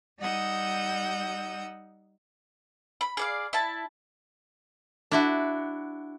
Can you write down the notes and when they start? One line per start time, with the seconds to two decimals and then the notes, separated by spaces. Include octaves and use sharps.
0.20 G3 D#4 F#5 D#6 E6 G6
3.01 B5
3.17 G#4 D5 F5
3.53 E4 A5
5.12 D4 E4 F#4